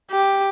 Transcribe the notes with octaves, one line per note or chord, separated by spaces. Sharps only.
G4